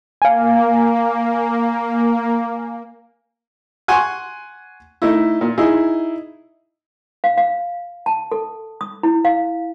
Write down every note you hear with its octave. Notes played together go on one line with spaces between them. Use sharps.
A#3 F5 G#5
F#5 G#5 C6 C#6
A3 D#4 E4
A#2
D#4 E4 G#4
F5
F5
A5
A4
D#6
E4
F5